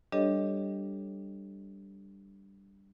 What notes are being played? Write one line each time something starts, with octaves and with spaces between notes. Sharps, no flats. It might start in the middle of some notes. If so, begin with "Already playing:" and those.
G3 D4 G4 A4 C#5 D#5